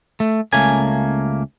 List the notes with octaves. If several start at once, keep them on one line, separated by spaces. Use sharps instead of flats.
A3
C#2 A3 A#3 C#4 G#5